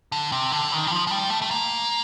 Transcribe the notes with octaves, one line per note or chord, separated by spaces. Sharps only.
D3
C3
D3
D#3
G3
F3
F3
G3
A3
A3
A#3